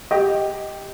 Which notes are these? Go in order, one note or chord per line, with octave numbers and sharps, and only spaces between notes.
G4 D#5